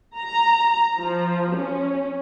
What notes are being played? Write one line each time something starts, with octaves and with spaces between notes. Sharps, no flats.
A#5
F3
C#4